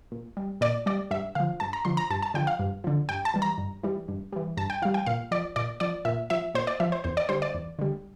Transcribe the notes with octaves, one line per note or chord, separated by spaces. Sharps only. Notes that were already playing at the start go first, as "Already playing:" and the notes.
A#2
G3
A#2 D5
G3 D5
G2 E5
D3 F3 F5
G2 A5
A#5
D3 F3 C6
A#5
G2 A5
A5
D3 F3 G5
F5
G2
D3 F3
G2 G5
A5
E3 G3
A#5
G2
E3 G3
G2
E3 G3
G2 A5
G5
E3 G3 F5
G5
A#2 F5
F3 D5
A#2 D5
F3 D5
A#2 E5
F3 E5
A#2 C5
D5
F3 E5
C5
E2 C5
D5
D3 G3 C5
D5
E2
D3 G3